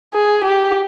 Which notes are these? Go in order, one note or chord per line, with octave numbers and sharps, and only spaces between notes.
G#4
G4